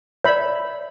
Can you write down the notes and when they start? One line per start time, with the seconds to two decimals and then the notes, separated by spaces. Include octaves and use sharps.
0.24 C#5 D5 E5 B5